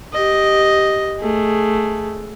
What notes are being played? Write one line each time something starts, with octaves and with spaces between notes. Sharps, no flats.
G4 D#5
A3 G#4